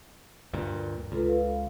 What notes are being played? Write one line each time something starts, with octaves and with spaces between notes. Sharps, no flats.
D2 G2 A#2
C#2 F4 A4 B4
F5